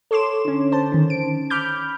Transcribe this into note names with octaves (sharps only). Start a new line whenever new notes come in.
A4 C#5 C6 D6 E7
D3 C#4
C5 A5
D#3 C#4
D7
B5 D6 F6 G6